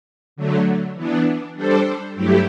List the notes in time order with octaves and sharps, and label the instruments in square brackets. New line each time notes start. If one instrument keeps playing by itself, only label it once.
[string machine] D3 F#3 A3
E3 B3 D4
G3 D4 A4 C5
G2 F#3 A3 E4 G4